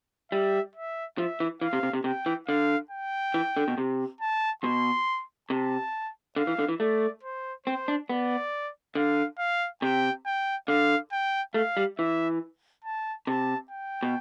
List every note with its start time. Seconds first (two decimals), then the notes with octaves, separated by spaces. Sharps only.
0.31 G3 E5
0.76 E5
1.18 F3 E5
1.40 E3
1.61 E3 F5
1.73 C3
1.83 C3
1.93 C3
2.04 C3 G5
2.26 E3
2.48 D3 F5
2.91 G5
3.34 E3
3.57 D3
3.68 B2
3.78 C3
4.21 A5
4.63 B2 C6
5.50 C3 A5
6.36 D3 F5
6.47 E3
6.59 D3
6.68 E3
6.80 A3 D5
7.23 C5
7.66 C4 C5
7.88 D4
8.10 B3 D5
8.95 D3 F5
9.38 F5
9.82 C3 G5
10.26 G5
10.68 D3 F5
11.12 G5
11.54 A3 F5
11.77 G3
11.98 E3 E5
12.85 A5
13.27 C3 A5
13.71 G5
14.03 B2